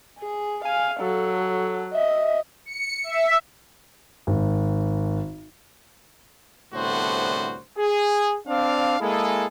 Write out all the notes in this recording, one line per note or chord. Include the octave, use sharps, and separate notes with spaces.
G#4
F5 G#5
F#3 A4
D#5 E5
C#7
E5
G#1
C2 A2 D3 B3 F#4 C5
G#4
C4 D4 D5 F5
G#3 A#3 E4 G#4 A4